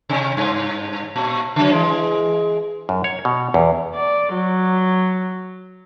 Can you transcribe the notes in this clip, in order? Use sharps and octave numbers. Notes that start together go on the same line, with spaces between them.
C3 C#4
G2
A#2
C#3 F#3
E3 G#3
F#2
C#5
B2
E2
D5
F#3